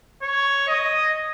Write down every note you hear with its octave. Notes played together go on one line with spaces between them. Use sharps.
C#5
D#5